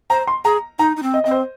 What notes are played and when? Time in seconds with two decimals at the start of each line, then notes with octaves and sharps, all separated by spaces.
0.10 C5 A#5
0.27 C6
0.45 G#4 A#5
0.79 D#4 A#5
0.97 D#4
1.03 C4
1.14 D#5
1.24 C4 D#5
1.31 C5